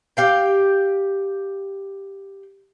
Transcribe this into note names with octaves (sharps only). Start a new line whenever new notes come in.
G4 F5 G5